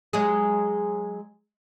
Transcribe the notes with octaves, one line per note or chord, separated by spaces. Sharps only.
F#3 G#3 G#4